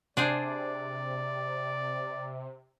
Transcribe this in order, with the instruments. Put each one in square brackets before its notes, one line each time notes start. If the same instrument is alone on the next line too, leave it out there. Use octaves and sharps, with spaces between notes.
[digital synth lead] C3 [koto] D4 G#4 C5 [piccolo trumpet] D5